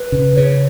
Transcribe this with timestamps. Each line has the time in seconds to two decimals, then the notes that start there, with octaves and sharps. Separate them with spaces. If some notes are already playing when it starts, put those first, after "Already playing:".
Already playing: B4
0.12 C#3
0.36 C#3 C#5